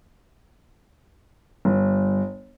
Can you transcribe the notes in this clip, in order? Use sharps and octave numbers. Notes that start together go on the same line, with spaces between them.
G1